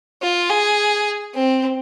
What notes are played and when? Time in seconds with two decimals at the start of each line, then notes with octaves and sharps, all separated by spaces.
0.22 F4
0.49 G#4
1.35 C4